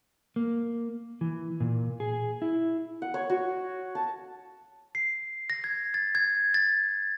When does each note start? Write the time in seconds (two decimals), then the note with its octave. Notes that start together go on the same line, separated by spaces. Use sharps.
0.36 A#3
1.21 E3
1.60 A#2
2.00 G#4
2.42 E4
3.02 F#5
3.14 C#5
3.30 F#4
3.95 A5
4.95 C7
5.50 A#6
5.64 G#6
5.94 A6
6.15 G#6
6.54 A6